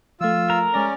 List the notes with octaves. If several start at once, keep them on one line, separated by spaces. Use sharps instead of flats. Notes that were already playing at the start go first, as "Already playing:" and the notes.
F3 A3 F4 E6
A#4
G#3 C#4 D5 D6 A#6